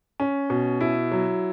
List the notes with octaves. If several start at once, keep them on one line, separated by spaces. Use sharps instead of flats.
C#4
B2
E4
F#3